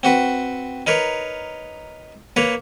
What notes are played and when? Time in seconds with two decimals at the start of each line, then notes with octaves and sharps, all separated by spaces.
0.03 C4 F#4 B4
0.87 D#4 A#4 B4 C#5
2.36 A#3 B4 C#5 A#5